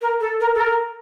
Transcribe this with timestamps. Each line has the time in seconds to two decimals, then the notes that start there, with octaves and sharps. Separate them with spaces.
0.01 A#4
0.20 A4
0.40 A#4
0.54 A4
0.60 A#4